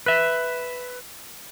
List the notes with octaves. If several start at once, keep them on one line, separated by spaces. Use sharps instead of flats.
B4 E5